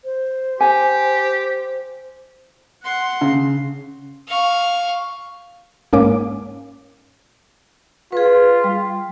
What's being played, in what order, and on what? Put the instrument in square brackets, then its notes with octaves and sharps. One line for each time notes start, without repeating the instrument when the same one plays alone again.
[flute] C5
[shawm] G4 [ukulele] G#5
[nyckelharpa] F#5 C6
[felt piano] C#3
[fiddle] F5 C#6
[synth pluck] G#2 A#3 C#4 D6
[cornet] F4 [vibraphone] G#4 B4
[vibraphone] G3